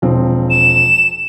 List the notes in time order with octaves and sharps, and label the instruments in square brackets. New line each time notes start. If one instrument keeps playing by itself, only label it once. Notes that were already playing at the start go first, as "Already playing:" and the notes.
[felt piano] E1 F3 C4
[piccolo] E7